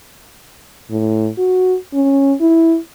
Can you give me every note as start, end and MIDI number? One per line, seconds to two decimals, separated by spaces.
0.90 1.29 45
1.38 1.76 66
1.93 2.33 61
2.40 2.77 64